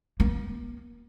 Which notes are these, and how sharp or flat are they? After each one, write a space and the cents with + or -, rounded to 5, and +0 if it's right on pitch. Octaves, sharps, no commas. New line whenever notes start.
A#3 +40